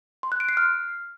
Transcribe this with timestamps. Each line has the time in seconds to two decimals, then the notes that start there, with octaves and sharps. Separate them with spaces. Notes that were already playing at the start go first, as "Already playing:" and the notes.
0.23 C6
0.32 F#6
0.40 D7
0.49 C7
0.57 F6